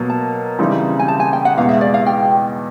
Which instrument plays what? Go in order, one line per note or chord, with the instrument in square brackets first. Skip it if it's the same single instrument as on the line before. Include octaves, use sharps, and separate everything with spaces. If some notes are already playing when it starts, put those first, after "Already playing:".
Already playing: [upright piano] B2 F#3 A#3
[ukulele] A5
[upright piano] C#3 E3 G3 C4 D#4
[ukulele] G#5
A5
G#5
G5
F#5
[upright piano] E2 B2 G#3 [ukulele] F5
[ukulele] E5
D5
F5
G5